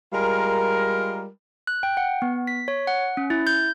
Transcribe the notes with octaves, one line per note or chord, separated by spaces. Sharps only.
G3 G#3 F4 A#4
F#6
G5
F#5
B3
B6
C#5
F#5
C#4
E4
G6